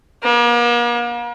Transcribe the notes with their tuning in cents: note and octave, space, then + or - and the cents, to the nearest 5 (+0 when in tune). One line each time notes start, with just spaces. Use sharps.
A#3 +40